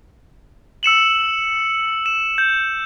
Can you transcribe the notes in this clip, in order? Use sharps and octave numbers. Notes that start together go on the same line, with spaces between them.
E6 C#7 E7 F#7
E7
G6